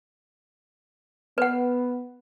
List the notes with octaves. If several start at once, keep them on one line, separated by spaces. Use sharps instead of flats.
B3 B4 F#5